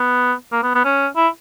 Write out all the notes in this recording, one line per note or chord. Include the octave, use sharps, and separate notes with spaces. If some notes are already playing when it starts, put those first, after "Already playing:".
Already playing: B3
A#3
B3
B3
C#4
E4